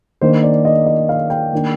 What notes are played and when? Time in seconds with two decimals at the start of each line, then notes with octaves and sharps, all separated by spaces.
0.21 D#3 A#3 D4 C5
0.43 D5
0.65 D#5
0.86 D#5
1.09 F5
1.30 G5
1.53 D#3 A#3 D4